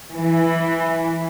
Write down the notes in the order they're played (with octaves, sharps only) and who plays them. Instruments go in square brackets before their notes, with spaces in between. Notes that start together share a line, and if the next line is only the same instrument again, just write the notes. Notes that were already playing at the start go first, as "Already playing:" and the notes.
[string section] E3